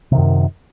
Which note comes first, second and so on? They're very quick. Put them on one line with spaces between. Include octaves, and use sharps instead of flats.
C3 D#3 F#2